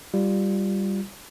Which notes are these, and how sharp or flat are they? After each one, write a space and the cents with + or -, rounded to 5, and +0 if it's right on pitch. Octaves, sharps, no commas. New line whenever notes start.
G3 +0 F4 +0